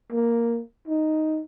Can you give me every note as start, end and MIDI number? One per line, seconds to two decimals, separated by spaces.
0.13 0.61 58
0.88 1.41 63